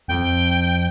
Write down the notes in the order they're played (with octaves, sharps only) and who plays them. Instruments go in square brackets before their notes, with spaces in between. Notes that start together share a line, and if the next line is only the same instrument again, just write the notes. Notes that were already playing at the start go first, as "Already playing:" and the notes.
[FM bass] F2 [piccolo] G5